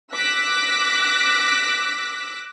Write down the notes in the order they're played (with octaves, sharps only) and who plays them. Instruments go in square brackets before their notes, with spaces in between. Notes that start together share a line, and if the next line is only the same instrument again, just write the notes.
[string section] D6 E6 F#6 A#6 B6